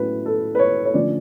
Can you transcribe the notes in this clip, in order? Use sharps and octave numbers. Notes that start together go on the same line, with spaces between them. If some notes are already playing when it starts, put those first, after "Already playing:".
Already playing: A2 F#3 C#4 B4
A4
B4
C#5
C#5
D3 F3 A3 C#4 D5